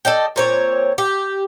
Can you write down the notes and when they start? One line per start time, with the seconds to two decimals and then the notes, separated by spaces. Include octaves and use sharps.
0.05 A4 D5 D#5 G5
0.36 A#2 C4 C#5
0.98 G4